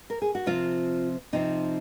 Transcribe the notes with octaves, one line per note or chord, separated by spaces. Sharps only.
A#4
G#4
F#4
C3 F3 C4 F4
C3 F3 C4 D#4